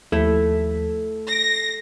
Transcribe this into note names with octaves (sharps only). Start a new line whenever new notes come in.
D#2 F3 A3 E4 A4 B6
A#6 C7 D7